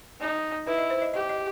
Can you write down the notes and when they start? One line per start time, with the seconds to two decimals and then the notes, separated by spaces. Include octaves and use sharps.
0.20 D#4
0.67 E4 B4
0.78 D#5
0.90 C5
1.02 D#5
1.14 G4 D#5
1.29 D#5